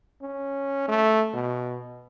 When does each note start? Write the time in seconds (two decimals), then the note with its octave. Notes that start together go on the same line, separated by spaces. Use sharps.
0.22 C#4
0.88 A3
1.34 B2